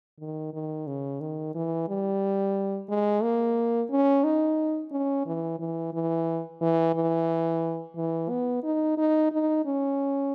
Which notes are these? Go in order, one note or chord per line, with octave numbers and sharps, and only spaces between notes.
D#3
D#3
C#3
D#3
E3
G3
G#3
A#3
C#4
D#4
C#4
E3
E3
E3
E3
E3
E3
B3
D#4
D#4
D#4
C#4